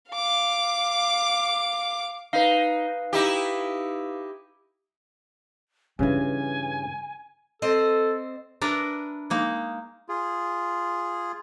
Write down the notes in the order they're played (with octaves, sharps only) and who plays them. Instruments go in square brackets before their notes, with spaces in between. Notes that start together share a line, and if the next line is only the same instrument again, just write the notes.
[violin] F5 D6
[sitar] D#4 [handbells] B4 F5
[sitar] D#4 E4 G4
[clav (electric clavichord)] G2 C#3 E3 [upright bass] C#4 D4 [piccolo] G#5
[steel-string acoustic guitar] C4 C5 D#5 [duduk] A4
[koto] D4 A#4 B4 E5
G#3 A#3 D#4
[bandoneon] F4 G#4